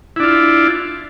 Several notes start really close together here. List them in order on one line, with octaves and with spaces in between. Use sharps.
E4 D4 F4